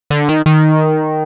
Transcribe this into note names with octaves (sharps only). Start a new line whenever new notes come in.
D3
D#3
D#3